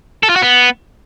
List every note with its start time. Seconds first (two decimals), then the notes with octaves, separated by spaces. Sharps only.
0.23 A4
0.30 F4
0.36 F#4
0.42 B3